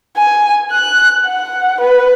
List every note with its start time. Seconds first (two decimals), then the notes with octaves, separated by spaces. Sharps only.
0.17 G#5
0.71 F#6
1.26 F#5
1.81 B4